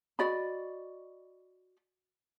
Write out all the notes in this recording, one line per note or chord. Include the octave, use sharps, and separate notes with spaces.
F#4 D5 D#5 B5